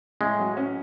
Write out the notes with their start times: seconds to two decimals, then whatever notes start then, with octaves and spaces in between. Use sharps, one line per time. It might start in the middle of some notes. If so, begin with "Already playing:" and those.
0.21 A2 G#3
0.39 F#3
0.57 C#4